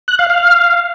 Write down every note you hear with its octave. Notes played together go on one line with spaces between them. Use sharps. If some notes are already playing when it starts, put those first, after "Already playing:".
F#6
F5
F5